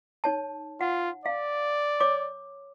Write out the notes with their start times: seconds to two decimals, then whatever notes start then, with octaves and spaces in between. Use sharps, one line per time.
0.24 D#4 C#5 A5
0.81 F4 F#5
1.26 D5 F5
2.00 C#5 D6